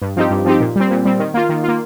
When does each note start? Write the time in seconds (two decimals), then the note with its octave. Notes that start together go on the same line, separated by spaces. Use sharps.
0.02 G2
0.17 F3 C4 D#4 G4
0.31 G2
0.45 F3 C4 D#4 G4
0.60 A#2
0.76 G3 C4
0.91 A#2
1.05 G3 C4
1.19 D#3
1.34 A#3 F4
1.49 D#3
1.64 A#3 F4